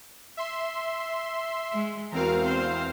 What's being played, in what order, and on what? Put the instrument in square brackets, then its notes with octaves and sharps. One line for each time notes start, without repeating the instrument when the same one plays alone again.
[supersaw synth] E5 C6
[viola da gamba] G#3
[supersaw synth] E2 C4 F5 [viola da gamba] F#4 A#4
[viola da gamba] C5